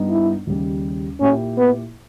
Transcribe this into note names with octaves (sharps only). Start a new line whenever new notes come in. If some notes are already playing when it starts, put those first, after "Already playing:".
Already playing: G2 G3 B3 D#4
E4
D#2 C#3 G3
A#2 A#3 C#4 E4 G4
B3